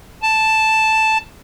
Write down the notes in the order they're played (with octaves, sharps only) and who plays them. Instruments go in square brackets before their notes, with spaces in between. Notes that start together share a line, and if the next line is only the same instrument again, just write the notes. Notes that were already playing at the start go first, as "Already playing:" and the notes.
[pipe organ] A5